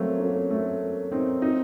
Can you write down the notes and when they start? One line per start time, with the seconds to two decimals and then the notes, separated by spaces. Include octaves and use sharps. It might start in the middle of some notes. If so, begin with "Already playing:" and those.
Already playing: F#3 A3 A#3 C4
0.20 A#3 C#4
0.50 A3 C4
1.12 C4 D#4
1.42 C4 D#4